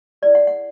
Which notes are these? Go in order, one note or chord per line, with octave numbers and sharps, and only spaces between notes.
E4 G#4 B4 D5
F#5
F#5